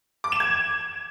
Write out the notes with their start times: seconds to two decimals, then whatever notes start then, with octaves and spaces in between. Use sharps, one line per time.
0.24 D6
0.32 E7
0.40 G#6